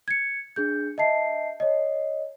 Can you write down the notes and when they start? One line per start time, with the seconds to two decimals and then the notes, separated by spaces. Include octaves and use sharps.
0.08 G#6 C#7
0.56 D4 G#4 G6
0.98 D#5 E5 A5 C7
1.60 C#5 D#5